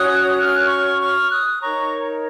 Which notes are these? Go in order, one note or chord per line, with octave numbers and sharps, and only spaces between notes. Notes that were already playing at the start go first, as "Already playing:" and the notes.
Already playing: C#4 F#4 C#5 D#6 F#6
F6
F#6
C#6 F6
C#6 F6
D#6 F#6
D#4 A#4 C#5 A#5 C#6